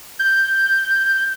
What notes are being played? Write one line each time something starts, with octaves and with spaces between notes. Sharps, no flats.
G6